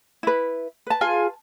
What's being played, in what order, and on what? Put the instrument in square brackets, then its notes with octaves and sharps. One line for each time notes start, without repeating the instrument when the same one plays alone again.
[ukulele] E4 B4
B4 A5
[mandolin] F4 G#4 G#5